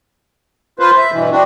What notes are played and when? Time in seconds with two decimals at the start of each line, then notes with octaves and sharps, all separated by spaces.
0.79 F4 B4 C5
0.97 E5
1.12 G2 B2 E3
1.31 C4 D4 F#4